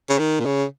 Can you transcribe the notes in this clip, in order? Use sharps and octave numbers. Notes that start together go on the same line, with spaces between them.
C#3
D#3
A#2
C#3